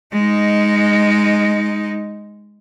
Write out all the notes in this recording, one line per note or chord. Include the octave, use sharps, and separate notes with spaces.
G#3 D#4